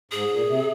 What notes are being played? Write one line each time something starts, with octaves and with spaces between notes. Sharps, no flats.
G#2 G#4
A#2
C3